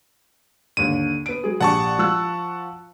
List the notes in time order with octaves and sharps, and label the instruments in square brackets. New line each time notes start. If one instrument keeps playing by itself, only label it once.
[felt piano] D#2 D3 [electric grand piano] D#7
[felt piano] B3 D7
F#3 G#4
[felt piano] A#1 G4 [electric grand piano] F#5 A5 C#6
[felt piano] F3 E6 F#6